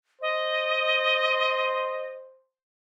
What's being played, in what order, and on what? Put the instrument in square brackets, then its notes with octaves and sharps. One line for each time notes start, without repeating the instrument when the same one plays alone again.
[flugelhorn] C5 [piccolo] D#5